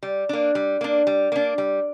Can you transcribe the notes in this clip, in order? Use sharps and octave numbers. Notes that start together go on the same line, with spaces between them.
G3
A#3 D4
G3
A#3 D4
G3
A#3 D4
G3